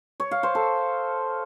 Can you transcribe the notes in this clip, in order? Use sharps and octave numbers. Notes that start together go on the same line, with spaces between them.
C#5
F5
C5
A4